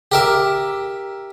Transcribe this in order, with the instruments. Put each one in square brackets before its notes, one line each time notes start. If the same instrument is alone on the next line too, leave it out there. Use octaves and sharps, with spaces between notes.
[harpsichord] G4 A#4 E5